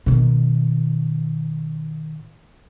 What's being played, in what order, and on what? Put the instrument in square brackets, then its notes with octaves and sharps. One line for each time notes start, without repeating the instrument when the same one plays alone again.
[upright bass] B2 D#3